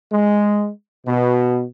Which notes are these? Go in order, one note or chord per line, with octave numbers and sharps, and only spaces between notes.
G#3
B2